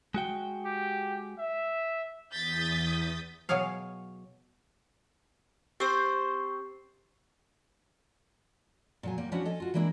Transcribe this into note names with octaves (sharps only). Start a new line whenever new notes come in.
G#3 F#4 G5
G4
E5
E2 D#6 G6 A6 B6
B2 F#3 G#4 C#5 F5
C4 G4 C5 C#6 C7
A#2 F#3 G#5
G3 A#3
F3 G3 C#4 D4 E4 F#4
A4 D#5 G#5
F4 F#4
E3 G#3 A#3 D4 E4